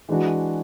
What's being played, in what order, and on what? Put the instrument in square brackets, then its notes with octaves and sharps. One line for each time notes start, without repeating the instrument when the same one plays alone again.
[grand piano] E3 G#3 D4 F#4